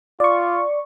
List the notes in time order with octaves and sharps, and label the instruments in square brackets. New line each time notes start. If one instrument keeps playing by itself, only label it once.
[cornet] F4 [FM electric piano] D5 C#6